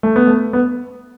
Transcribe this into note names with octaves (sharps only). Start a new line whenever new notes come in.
A3
B3
A3
B3